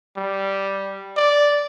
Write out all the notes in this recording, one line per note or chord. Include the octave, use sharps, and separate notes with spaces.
G3
D5